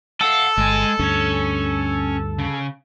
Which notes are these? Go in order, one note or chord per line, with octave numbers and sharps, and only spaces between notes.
A4 F5 F#5
G1 G#3 G#5
D2 G2 C#4 C#5
C#3